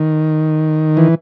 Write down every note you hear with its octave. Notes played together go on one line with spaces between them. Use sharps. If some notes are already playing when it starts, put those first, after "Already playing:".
Already playing: D#3
E3